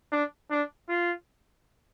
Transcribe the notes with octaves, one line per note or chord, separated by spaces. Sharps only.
D4
D4
F4